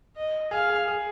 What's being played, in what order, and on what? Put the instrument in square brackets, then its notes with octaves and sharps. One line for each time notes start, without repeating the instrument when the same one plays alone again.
[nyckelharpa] D#5
[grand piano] G#4 [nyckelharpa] F5
[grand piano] G#4
G#4